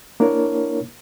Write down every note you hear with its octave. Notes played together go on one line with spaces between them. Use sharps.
A#3 D4 E4 A#4 C#5